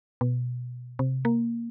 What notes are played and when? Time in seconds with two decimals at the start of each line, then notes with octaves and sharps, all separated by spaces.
0.21 B2
0.99 C3
1.25 A#3